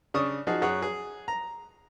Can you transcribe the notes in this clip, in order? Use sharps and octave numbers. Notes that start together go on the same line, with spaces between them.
C#3 D4 C#6 D#6
F3 D#4 F#4 G#4
F#2 F#4 G#4 C#5 F#5 F#6
G#4
A#5